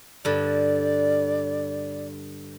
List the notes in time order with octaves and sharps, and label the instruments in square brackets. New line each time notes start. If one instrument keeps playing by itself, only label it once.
[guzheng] G2 D3 [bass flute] D5